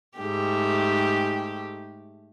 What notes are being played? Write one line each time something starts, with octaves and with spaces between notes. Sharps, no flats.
G#2 A3 G4